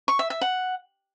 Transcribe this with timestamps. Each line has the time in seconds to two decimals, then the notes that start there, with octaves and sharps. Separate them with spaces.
0.08 C#6
0.19 E5
0.30 E5
0.41 F#5